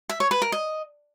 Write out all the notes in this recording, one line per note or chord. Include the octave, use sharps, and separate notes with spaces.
E5
C#5
B4
A#4
D#5